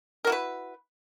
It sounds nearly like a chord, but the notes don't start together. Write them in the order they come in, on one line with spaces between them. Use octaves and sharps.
A#4 F#4 E4 B4